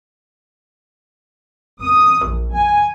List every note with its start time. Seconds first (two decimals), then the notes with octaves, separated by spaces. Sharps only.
1.84 D#6
2.24 A#1
2.57 G#5